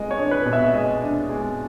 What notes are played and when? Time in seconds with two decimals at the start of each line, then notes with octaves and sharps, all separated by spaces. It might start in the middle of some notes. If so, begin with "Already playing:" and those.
Already playing: G#3 B3 D#5
0.11 C#5
0.18 D4
0.31 B4
0.45 B2
0.53 E5
0.74 G#3 D#5
1.02 D4
1.29 G#3